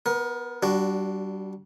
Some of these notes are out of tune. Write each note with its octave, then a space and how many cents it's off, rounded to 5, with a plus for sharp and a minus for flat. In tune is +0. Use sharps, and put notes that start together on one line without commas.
B3 +0 A#4 +30
G3 -30 D4 +0 F#4 +0